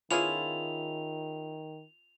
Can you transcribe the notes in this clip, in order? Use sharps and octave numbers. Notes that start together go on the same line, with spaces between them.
D#3 B3 C#4 E4 F4 G#4 F7